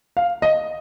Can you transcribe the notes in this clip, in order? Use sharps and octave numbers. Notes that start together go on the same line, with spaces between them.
F5
D#5